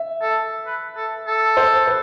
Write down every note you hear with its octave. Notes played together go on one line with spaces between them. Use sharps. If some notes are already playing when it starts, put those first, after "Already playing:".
Already playing: E5
A4
B4
A4
A4
C5
B4